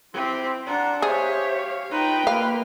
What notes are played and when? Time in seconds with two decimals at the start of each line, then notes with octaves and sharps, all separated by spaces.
0.13 C4 E4 G4 C5 C6
0.66 D4 F#5 A#5 C6
1.02 G4 G#4 C5 C#5 E5 F5
1.91 D#4 F4 B4 G5 B5 C6
2.27 A#3 F5